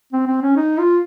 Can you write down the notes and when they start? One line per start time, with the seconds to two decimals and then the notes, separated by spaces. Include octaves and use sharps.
0.13 C4
0.27 C4
0.41 C#4
0.56 D#4
0.78 F4